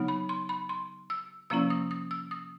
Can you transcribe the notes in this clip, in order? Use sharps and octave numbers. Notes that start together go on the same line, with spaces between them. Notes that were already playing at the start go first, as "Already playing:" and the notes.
Already playing: C#3 F#3 B3 D#4
B5
C6
B5
C6
E6
C3 F3 A#3 C#4 E4 E6
D#6
D#6
E6
D#6